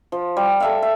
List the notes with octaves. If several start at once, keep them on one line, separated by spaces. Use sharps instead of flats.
F3
G3
A4 E5 F5
E5